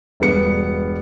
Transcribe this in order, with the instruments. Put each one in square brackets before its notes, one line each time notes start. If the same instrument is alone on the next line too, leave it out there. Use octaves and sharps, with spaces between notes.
[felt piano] E1 G2 B3 C#7